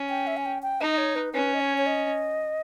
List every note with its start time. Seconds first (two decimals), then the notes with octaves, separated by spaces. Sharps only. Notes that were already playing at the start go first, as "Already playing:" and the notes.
Already playing: C#4
0.09 G5
0.27 E5
0.37 G#5
0.46 G5
0.63 G5
0.81 D#4 D#5
0.98 C#5
1.16 B4
1.34 C#4 B4
1.54 D#5
1.60 C#5
1.78 C#5
1.86 D#5